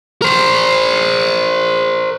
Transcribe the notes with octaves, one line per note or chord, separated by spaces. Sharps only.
A#4 C5